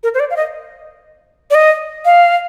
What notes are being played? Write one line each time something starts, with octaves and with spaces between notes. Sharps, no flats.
A#4
C5
D5
F5
D#5
D5
D#5
F5